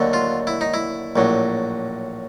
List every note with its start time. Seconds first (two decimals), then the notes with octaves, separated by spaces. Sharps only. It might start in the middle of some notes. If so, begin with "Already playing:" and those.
Already playing: D#2 D3 F#3 A3
0.13 F4
0.47 E4
0.61 D#4
0.74 E4
1.16 A#1 A2 F#3